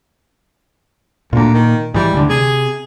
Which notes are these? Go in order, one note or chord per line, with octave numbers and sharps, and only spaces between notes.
D2 A#2 A#3
D#3
G#2 E3 G3
D2 D3
C3 G#4